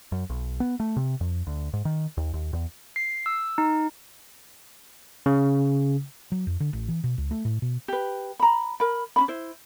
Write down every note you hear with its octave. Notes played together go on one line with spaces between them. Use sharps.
F#2
B1
B3
A3
C3
F2
D2
G#2
D#3
D#2
D#2
E2
C7
E6
D#4
C#3
F#3
F2
D3
A1
E3
B2
C#2
A3
A2
B2
G4 B4
A#5 B5
A#4 B5
C#4 D#4 B5
E4 C5